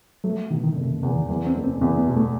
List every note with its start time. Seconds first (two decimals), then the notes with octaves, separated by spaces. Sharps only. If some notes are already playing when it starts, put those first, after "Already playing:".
0.24 F#3 A3
0.51 B2 D#3
0.63 D#3
0.76 F#1 C3
0.90 D#3
1.03 E2 C3
1.16 D#3
1.29 E2 F#3
1.47 C4
1.55 F#1
1.64 C4
1.81 E2 C4
1.98 B3
2.07 B2
2.17 A3